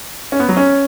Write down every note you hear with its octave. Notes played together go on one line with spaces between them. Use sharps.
C#4
B3
F#3
C#4